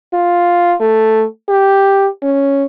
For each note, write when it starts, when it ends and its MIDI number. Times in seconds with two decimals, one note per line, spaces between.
0.14 0.75 65
0.80 1.24 57
1.49 2.07 67
2.23 2.65 61